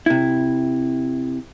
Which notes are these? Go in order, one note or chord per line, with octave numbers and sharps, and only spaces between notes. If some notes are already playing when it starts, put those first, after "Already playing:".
C3 E4